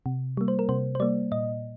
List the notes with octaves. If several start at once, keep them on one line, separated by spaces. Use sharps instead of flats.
C3
G3 A#3
C5
A#4
C3 C5
C5
G3 A#3 D5
A#2 D#5